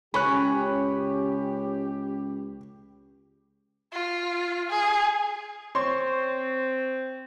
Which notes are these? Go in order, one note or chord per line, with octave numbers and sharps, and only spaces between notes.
C#2 C#3 C#4 G4 B5 C#6 F#6
F4
G#4
C4 C#5 C6 C#6